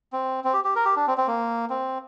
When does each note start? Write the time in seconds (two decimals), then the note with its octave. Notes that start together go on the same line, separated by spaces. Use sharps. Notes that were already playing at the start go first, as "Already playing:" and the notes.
0.13 C4
0.44 C4
0.54 G4
0.64 G4
0.75 A#4
0.85 G4
0.96 D4
1.07 C4
1.18 C4
1.27 A#3
1.70 C4